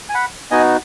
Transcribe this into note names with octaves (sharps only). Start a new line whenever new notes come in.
G#5
F#5 B5
B3 D#4 F#4 D#5 G#5